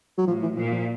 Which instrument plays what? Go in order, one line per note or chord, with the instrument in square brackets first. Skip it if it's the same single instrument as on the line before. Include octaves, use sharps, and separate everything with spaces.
[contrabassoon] F#3
[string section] A2 [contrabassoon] F3
[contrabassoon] E3
[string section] A#2 [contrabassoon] F3
[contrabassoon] F3